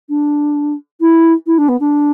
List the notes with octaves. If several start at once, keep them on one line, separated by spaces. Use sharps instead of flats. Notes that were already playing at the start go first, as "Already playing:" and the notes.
D4
E4
E4
D4
B3
D4